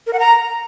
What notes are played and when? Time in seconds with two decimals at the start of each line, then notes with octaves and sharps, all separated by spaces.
0.07 A#4
0.13 F#5
0.20 A#5